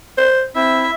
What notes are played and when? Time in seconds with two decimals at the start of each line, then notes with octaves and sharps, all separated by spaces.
0.18 C5
0.56 C4 E4 E5